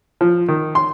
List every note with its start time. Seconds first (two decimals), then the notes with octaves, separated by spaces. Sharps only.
0.21 F3
0.48 D#3
0.75 C6